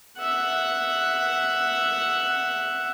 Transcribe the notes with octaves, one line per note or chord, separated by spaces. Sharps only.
E5 F#5